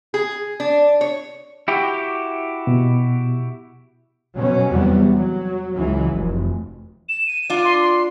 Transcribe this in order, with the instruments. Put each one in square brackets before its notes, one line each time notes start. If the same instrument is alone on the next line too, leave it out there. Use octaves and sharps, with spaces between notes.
[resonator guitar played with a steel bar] G#4
D4
C#5
[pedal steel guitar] E4 F#4 G4
[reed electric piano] B2
[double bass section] B2 F#3 C#4
E2 C3 F#3 G3 B3
F#3
C#2 E3 F#3
F1
[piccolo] E7
D#7
[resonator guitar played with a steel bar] D4 F4
[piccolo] C6
C6